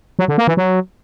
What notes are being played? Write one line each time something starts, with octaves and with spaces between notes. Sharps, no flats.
F#3
D3
A#3
E3
F#3